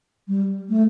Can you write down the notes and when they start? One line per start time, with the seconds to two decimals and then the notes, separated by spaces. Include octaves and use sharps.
0.28 G3
0.69 A3